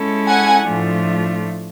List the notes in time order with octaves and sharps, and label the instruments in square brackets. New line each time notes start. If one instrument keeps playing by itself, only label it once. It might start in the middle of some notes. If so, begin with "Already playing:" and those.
Already playing: [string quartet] G#3 C#4 E4 A4
[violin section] F#5 G#5
[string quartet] A2 F3 A3 D4 F4